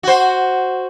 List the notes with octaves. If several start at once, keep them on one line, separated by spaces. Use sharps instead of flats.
F#4 C5